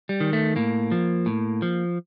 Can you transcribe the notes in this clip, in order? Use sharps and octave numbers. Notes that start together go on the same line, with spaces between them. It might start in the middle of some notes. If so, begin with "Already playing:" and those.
G3
D#3
A3
A2 A#3
F3
A2
F3